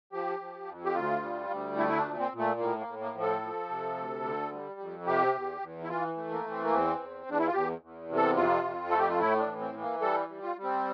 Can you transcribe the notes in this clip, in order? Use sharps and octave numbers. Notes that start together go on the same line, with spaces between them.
F3 G4
F3
F2
G4
D2 F4
G3
D2
A3 E4
E4
D4
A#2
C4
A#2
A3
A2 A#3
A#3
A2
A#3
F3
A4
F3
C3
D2
D3
G3
F2
C3 G4
E2
E2
E4
E3 F4
A3
A#3
E3
C4
A#3
E2 C4
E2
E2 D4
E4
F4
E2 G4
E2
C3
A4
F2 F4
F2
A3 A4
G4
F4
A2 E4
D4
E3
C4
E3
A#3
G3 A4
G3
F4
G3
C4